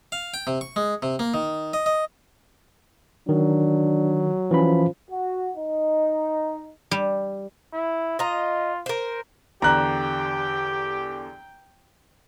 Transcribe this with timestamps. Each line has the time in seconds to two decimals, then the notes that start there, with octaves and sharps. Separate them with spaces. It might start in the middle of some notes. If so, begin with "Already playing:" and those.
0.12 F5
0.34 G5
0.47 C3
0.61 C#6
0.76 G#3
1.02 C3
1.19 A#3
1.34 D#3
1.73 D#5
1.86 D#5
3.29 D#3 F#3 D4
4.51 E3 F3 C#4 B5
5.10 F#4
5.56 D#4
6.91 G3
7.73 E4
8.19 F4 D#5 A#5
8.86 A#4 C5
9.62 E2 D3 G4 D5 G5 A#5 F#6